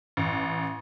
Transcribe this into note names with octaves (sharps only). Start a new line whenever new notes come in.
A1